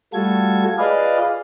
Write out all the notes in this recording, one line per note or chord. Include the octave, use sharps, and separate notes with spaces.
G3 A3 F4 F#4 A4 G#6
F4 G#4 B4 D5 D#5 F5